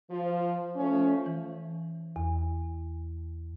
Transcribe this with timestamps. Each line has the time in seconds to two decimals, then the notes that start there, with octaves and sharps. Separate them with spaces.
0.11 F3
0.76 F3 A3 C#4
1.26 E3
2.16 E2